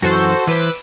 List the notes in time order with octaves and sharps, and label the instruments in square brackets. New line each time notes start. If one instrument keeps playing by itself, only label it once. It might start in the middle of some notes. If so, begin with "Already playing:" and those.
[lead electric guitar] F#2 E3 [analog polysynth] F#4 A4 C5
[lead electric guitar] E3 C5 [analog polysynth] B4 D6 E6